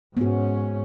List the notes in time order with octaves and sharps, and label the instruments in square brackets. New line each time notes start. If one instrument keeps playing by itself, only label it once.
[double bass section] G#2 C#4 [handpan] B3 F#4